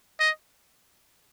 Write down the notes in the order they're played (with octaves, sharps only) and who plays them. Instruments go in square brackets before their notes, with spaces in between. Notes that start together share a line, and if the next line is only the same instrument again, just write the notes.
[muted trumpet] D#5